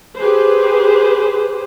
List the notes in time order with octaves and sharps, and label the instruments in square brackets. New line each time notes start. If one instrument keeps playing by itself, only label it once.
[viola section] G4 G#4 B4 C5